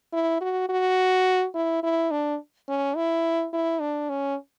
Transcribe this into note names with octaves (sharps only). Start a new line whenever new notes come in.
E4
F#4
F#4
E4
E4
D4
C#4
E4
E4
D4
C#4